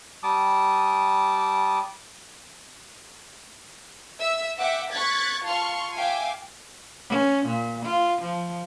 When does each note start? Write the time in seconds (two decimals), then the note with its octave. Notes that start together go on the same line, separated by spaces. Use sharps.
0.23 G3 A5 D6 D#6
4.19 E5 E6
4.59 E5 F#5 G5 D6
4.91 C#6 F#6 G#6 A6 B6
5.47 F4 A5 C6 C#6 F6
5.96 E5 F5 G5 G#5 D6
7.09 C#4
7.46 A#2
7.85 F4
8.22 F3